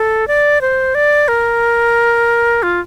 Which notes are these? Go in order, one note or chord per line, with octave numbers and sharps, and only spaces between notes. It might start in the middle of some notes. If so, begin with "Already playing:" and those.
Already playing: A4
D5
C5
D5
A#4
F4